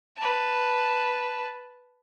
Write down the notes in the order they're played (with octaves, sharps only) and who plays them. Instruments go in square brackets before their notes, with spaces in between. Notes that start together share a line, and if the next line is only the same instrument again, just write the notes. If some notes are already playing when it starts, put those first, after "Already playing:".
[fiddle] B4 A5